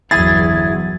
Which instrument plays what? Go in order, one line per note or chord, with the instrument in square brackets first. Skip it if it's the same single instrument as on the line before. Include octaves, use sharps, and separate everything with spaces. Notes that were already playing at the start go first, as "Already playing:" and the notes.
[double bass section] G1 E2 F#3 [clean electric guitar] E4 G#4 [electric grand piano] A6